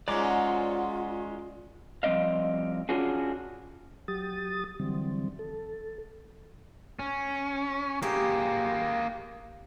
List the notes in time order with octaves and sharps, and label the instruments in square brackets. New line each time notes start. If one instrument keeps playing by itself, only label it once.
[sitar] G#2 F#3 [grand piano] G#3 C#4 [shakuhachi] F4 [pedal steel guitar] D5 A#5 D6
[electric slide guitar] F3 G3 C4 D5 D#5 F5
C#4 D4 F4 F#4 G#4
[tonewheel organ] F#3 G4 D#6 A6
D3 E3 F#3 G3 C4
A4
[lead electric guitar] C#4
[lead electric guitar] A#3 G#4 [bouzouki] G4